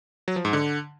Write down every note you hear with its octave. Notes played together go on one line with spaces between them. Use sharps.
F#3
F3
G#2
D3